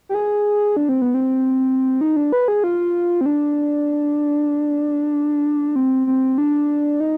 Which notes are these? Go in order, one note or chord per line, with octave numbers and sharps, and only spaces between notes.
G4
G#4
D4
C4
B3
C4
D#4
D4
B4
G#4
F4
C4
D4
C4
C4
D4
D#4